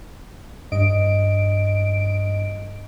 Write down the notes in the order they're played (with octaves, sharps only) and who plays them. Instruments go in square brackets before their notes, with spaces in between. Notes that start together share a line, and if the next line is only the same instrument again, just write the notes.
[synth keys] G2 D#5 D7